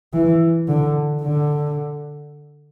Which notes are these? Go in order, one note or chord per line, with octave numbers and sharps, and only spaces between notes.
E3
D3
D3